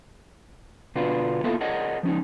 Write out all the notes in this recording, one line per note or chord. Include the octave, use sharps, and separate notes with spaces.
B2 D3 D4 F4 F#4 B4
A#3 B3 E4 F4 A4 F5
G#4 A#4 C#5 D#5 F#5
F3 C#4 D#4